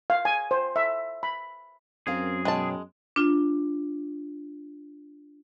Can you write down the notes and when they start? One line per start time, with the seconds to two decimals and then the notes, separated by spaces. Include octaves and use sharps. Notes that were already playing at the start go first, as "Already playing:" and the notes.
0.10 F5
0.25 G#5
0.51 C5
0.76 E5
1.23 B5
2.07 F#2 C4 G#4 A#4 F5
2.45 B2 F#3 G#3 G5 A5
3.16 D4 F4